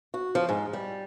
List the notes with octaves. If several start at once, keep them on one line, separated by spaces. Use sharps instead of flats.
F#4
F3
G#2
G3